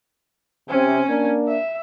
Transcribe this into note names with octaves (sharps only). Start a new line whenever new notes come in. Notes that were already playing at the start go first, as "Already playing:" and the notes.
C3 C4 C#4 G#5
A#3 D4
E5